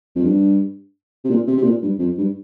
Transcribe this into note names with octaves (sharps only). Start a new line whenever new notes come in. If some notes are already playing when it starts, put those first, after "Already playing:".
F2
G2
C3
A#2
C3
C3
A#2
G2
F2
G2